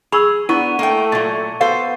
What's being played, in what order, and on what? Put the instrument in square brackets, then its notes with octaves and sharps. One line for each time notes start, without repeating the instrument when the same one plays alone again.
[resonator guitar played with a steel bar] G#4 [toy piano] B5 C#6 E6
[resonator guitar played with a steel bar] B3 [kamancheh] D4 F#5 [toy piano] E4 [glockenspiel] C#6 D#7
[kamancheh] A3 [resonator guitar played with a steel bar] A#3 G5
[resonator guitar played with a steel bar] A#2 F#3 [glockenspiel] A6
[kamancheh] B3 [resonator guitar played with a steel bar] F#4 A4 C5 [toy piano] F5